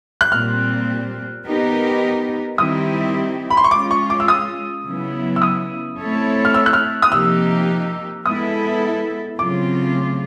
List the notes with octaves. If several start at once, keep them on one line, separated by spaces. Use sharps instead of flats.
F#6
A#2 G3 C4 F6
B3 D#4 G4 A#4
D#3 G3 C4 E4 G4 D#6
B5
C6
C#6
G#3 C#4 F4 D6
C#6
D6
E6
D#6
C#3 F#3 B3 E4
E6
D#6
A3 C4 E4 A4 C#5
F6
E6
F#6
F6
D#6
C3 F3 A#3 D#4 G4 E6
G#3 B3 E4 A4 D#6
C#3 F#3 A3 C4 F4 D6